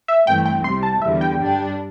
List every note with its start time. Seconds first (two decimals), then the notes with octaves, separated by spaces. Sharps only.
0.08 E5
0.27 G2 E3 A3 C4 G5
0.46 G5
0.64 C2 C3 G3 C6
0.83 A5
1.02 E2 D3 G3 E5
1.21 G5
1.40 G2 G3 D4